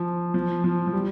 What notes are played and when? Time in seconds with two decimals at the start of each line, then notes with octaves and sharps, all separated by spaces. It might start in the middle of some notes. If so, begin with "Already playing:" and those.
Already playing: F3
0.34 F3
0.64 F3
0.87 F3
0.93 G3